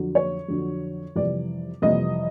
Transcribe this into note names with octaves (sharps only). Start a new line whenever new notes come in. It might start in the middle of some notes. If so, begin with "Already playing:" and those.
Already playing: F2 D3 F#3
C#5
F2 D3 F#3
F2 C3 E3 G3 D5
F2 C3 E3 G3 D#5